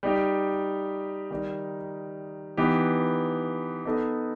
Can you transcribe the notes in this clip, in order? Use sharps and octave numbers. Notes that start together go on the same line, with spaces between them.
G3 D#4 G4
D#3 G3 D#4
E3 B3 D#4 G4
B3 D#4 A4 D#5